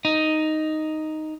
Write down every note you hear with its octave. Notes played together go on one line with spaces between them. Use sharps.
D#4